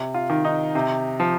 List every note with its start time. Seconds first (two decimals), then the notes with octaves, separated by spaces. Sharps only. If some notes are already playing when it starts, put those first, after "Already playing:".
Already playing: C3
0.14 F4
0.30 D#3
0.45 D#4
0.75 C3
1.20 F3